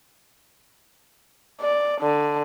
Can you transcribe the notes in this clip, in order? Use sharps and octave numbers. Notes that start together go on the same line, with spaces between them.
D5
D3